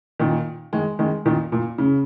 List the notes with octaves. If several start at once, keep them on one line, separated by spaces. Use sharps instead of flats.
A#2 D#3
D#3 G#3
D#3 G#3
A#2 D#3
A#2
C#3